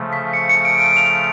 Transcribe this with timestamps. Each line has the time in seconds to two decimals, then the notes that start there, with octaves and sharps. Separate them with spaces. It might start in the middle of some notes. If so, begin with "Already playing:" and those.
Already playing: C#3 F3 A3
0.13 B6
0.33 C#7
0.49 C#7
0.65 D7
0.80 D7
0.97 F7